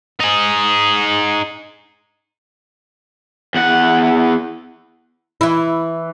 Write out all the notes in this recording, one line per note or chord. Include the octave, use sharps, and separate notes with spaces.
D#4 G#4
E2 F#5
E3 E4